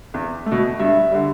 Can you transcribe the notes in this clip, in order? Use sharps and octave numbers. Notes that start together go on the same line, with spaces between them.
E2
A3
B2
G2 E5
D3 G3